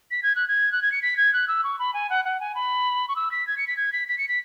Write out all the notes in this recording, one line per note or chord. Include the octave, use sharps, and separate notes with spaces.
B6
G#6
F#6
G#6
F#6
G#6
C#7
B6
G#6
F#6
E6
C#6
B5
G#5
F#5
F#5
G#5
B5
C#6
E6
B6
G#6
C#7
B6
G#6
B6
B6
C#7
B6